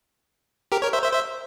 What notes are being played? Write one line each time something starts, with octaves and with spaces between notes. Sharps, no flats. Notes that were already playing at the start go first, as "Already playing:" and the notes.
G4 A#4
A#4 C#5
C5 E5
C5 E5
C5 E5